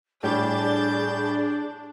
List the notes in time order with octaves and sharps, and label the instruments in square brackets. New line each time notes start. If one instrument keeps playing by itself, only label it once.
[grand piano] A2 G3 G4 [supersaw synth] D4 [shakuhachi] G#4 [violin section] G6 A6